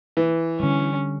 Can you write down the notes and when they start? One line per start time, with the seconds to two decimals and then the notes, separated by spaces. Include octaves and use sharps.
0.17 E3
0.60 D3 G3 C#4